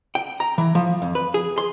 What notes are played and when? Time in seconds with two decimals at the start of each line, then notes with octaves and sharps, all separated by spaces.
0.15 G5
0.40 A#5
0.58 E3
0.75 F3
1.02 F2
1.15 B4
1.34 G#4
1.58 C6